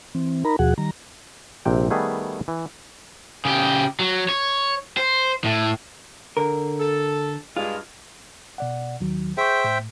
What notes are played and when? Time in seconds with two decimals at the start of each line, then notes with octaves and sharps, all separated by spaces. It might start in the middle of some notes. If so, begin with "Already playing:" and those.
0.15 E3 C4
0.44 D#4 A#4 A#5 B5
0.59 D#2 B2 F3 F#4 G#4 F#5
0.78 D#3 G3 A#5
1.65 A#1 C3 G5
1.90 D#3 G3 A3 B3 G#4
2.48 E3
3.45 C#3 G4
3.99 F#3
4.29 C#5
4.97 C5
5.44 A2
6.37 D3 A#4
6.80 A4
7.57 G2 G#3 F4
8.58 B2 D5 F#5
9.01 D#2 D#3 F#3
9.37 G#4 C5 E5 G5 C#6
9.64 A2